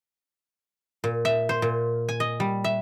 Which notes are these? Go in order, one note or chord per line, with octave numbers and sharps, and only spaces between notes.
A#2
E5
C5
A#2
G#5
D#5
G3
E5